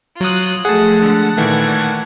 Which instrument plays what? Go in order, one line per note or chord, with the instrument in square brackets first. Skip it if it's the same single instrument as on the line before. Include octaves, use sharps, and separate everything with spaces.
[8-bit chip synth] F#3 D#6 [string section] F4 F#6
[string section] F3 A3 [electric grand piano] G#4 [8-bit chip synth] F#5 A5
[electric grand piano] D3 G#3
[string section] A#2 D5 G#6 [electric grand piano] D#3 E3 A3